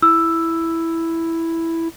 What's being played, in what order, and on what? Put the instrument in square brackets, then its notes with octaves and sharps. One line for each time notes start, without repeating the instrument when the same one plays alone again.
[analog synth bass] E4 [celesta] E6